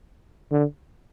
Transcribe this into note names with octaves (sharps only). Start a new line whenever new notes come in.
D3